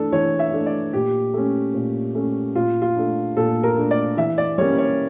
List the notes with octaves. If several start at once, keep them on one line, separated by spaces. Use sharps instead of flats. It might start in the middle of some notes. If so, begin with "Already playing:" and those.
Already playing: E3 A3 D4 A4
E3 C#5
E5
A3 D4
D5
A#2 G4
A3 C#4
A#2
A3 C#4
A#2 F4
F4
A3 D4
A#2 A4
A#4
A3 D4
D5
E3 E5
D5
G3 A#3 C#4 C#5
C#5